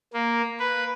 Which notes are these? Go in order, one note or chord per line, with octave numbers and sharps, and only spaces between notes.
A#3
B4